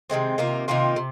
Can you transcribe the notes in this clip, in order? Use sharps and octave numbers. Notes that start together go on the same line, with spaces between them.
C3 D#3 G#3 C4
C3 D#3 A#3 F4
C3 D#3 A#3 F4
C3